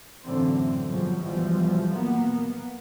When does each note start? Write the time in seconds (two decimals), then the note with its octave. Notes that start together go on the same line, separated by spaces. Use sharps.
0.24 F#2 A2 D3 E3 C4
0.89 G2 B2 F3 F#3 G#3
1.21 B1 B2 E3 F3 G3
1.92 B2 A#3 B3